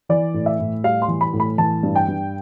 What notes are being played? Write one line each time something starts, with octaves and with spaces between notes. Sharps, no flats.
E3 D5
A2
E5
A2
G3 F5
C6
E3
B5
A2
B5
E3 A5
G2
G5
G2